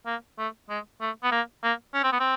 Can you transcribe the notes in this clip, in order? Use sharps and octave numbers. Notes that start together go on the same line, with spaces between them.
A#3
A3
G#3
A3
B3
A#3
A#3
C#4
C4
B3
C4